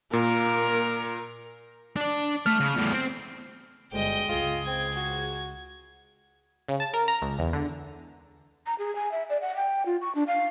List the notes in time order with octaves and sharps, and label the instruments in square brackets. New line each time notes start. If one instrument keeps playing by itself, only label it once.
[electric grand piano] A#2 [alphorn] A#3 [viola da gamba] A#4
[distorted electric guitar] D4 D5
[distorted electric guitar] A3 [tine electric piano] F6
[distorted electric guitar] C#3
E2 A2
C4 G5
[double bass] G1 G#3 [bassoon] D2 [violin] D#5 G5
[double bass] C#2 [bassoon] F4 [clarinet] G#4
[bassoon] C4 [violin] G#6
[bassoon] F#4
[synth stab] C#3
A5
A#4
A#5
C#2
E2
D3
[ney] A#5
G#4
G#5
E5
D5
F#5
G5
F4
C#6
D4
F5